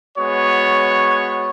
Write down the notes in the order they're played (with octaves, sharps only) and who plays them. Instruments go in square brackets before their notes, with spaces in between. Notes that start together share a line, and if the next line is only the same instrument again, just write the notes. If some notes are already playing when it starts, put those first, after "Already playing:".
[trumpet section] G#3 B3 F#4 C#5